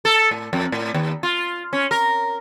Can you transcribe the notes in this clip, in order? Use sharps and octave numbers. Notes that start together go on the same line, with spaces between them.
A4
A2
F2
A2
D#2
F4
C#4
A#4